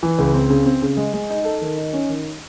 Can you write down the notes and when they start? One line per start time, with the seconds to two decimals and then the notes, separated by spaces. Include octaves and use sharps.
0.03 E3
0.19 C#2
0.34 C4
0.50 C#3
0.66 C4
0.82 C#3
0.97 G#3
1.13 G#3
1.30 D#4
1.45 A4
1.61 D#3
1.77 D#4
1.93 C#4
2.09 D#3